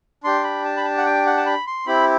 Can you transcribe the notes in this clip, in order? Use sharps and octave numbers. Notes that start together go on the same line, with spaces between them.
D4 G4 C6
B5
A5
B5
A5
F#5
G5
F#5
A5
B5
C6
C4 E4 G4 B5